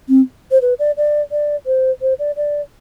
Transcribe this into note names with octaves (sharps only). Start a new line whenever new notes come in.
C4
C5
B4
D5
D5
D5
C5
C5
D5
D5